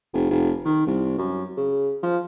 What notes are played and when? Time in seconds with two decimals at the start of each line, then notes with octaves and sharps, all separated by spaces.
0.13 F1
0.31 F1
0.65 D#3
0.87 C2
1.18 F#2
1.57 C#3
2.03 F3